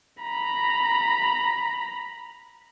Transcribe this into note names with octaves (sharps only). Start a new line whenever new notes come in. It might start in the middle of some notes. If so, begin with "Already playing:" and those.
A#5 B5